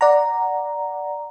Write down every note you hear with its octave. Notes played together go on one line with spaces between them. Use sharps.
D5 F#5 A#5